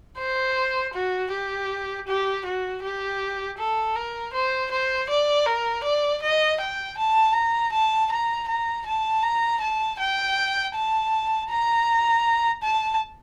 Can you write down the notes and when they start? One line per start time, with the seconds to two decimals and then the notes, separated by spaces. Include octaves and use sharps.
0.19 C5
0.94 F#4
1.32 G4
2.08 G4
2.45 F#4
2.83 G4
3.59 A4
3.96 A#4
4.34 C5
4.71 C5
5.09 D5
5.46 A#4
5.84 D5
6.22 D#5
6.60 G5
6.98 A5
7.35 A#5
7.72 A5
8.11 A#5
8.48 A#5
8.86 A5
9.23 A#5
9.61 A5
9.99 G5
10.75 A5
11.50 A#5
12.63 A5